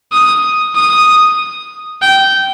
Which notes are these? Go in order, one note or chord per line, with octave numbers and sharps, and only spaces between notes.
D#6
D#6
G5